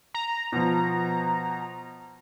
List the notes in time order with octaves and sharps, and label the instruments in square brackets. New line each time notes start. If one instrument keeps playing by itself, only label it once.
[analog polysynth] A#5
[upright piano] B2 F3